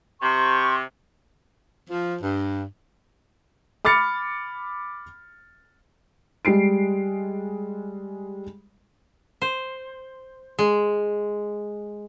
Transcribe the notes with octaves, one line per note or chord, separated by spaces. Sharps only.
C3 C6 C#6
F3
G2
B5 D6 F6 A6 C#7
G3 G#3 C7 D7
C5
G#3